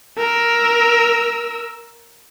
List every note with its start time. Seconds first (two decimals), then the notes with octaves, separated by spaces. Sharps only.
0.18 A#4 E6